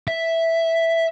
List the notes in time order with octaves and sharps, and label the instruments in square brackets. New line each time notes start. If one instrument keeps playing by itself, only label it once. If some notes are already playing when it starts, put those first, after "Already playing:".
[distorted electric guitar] E5